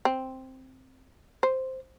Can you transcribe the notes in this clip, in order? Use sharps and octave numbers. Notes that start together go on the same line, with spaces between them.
C4
C5